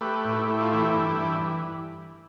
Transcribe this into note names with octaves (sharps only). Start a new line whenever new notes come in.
A3 G4 B4
A2
E4 G4
A3
F4
E3 E4 G4
G2
E3